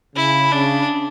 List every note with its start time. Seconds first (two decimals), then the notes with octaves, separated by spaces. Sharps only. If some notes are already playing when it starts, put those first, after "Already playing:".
0.16 C#3 E4
0.52 C#3 D4